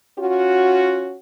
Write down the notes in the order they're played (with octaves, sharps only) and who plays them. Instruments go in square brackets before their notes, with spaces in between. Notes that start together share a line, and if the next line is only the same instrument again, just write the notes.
[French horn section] C#4 F4 F#4